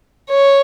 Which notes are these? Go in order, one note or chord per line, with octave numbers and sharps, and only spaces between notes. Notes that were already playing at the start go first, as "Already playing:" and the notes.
C#5